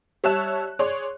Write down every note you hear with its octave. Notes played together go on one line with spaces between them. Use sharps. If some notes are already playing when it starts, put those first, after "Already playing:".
G3 C#5 E5 A5 F#6 E7
G#4 C#5 D5 C6